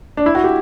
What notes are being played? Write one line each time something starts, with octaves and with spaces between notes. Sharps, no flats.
D4
E4
F#4
G4